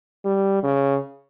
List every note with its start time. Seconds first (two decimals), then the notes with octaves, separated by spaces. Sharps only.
0.26 G3
0.63 C#3